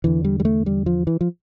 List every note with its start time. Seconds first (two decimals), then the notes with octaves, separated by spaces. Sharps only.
0.04 E2 D3 E3
0.24 G3
0.40 G3
0.45 A3
0.66 G3
0.86 F3
1.07 E3
1.21 F3